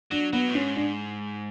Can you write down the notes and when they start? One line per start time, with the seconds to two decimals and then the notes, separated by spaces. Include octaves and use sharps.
0.11 F#3 D4
0.33 F#3 B3
0.48 A2
0.55 G#2 C#4
0.76 D4